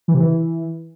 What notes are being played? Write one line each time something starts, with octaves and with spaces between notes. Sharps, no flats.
E3
C3
E3